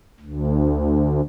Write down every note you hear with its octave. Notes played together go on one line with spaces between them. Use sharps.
D2